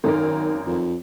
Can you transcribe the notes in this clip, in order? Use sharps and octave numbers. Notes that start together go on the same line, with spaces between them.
G#1 F#2 D#3 A#4
F2